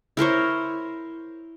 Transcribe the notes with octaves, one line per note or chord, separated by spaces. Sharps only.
E4 A#4 C5 C#5